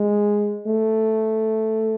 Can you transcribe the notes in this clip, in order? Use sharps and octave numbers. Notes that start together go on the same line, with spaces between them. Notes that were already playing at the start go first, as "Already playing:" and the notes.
Already playing: G#3
A3